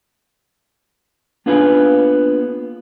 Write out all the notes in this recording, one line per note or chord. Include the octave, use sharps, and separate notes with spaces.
A#3 B3 D4 F4 G#4 B4